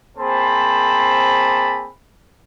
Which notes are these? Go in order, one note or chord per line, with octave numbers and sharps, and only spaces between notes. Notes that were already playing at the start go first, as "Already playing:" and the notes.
A#3 C4 G#4 C5 A5 B5